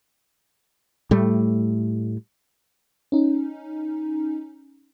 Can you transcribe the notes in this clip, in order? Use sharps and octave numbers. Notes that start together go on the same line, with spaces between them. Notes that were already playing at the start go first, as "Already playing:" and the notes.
A2 G3 A3
C#4 D#4